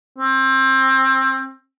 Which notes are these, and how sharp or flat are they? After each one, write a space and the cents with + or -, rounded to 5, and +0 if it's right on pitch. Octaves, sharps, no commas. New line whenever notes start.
C4 +25